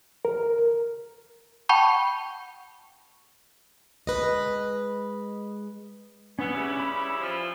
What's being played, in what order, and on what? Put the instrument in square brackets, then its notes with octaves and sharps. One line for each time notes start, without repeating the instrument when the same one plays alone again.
[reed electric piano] A#4
[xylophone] F#5 G5 A5 B5 C#6 G6
[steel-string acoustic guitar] G#3 B4 D#5
[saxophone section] B3 [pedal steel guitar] C#4 E6
[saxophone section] C#3 G3 E4
[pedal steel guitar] B5 E6
[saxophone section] E3 F3